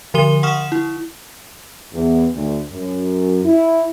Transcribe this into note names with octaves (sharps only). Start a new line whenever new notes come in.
D3 F3 A#4 C6 D#7 G7
F#5 C#6 D#6 F6 E7
E4
E2
D2
F#2
E4